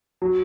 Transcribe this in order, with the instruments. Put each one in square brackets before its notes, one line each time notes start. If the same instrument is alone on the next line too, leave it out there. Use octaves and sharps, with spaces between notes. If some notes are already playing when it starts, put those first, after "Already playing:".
[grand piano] F#3